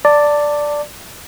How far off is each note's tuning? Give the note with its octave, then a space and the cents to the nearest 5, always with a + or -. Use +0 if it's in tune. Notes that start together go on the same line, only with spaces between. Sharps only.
D5 +0 A5 +25